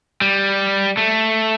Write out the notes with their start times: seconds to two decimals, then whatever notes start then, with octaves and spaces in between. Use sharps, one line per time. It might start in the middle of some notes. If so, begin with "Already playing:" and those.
0.21 G3
0.97 A3